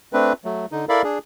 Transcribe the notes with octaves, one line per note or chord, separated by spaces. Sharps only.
A3 C4 D4 B4
F#3 A3
D3 D#4
E4 A4 A#4 D5 F5 B5
D4 G#4